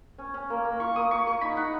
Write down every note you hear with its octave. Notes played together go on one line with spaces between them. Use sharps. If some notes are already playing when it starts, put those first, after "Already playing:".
C#4
C#4
A#3
A#3
F4 C#6
A#3 D#6
A#3 C#6
A#3 C#6
D#4 B5
D#4 F#5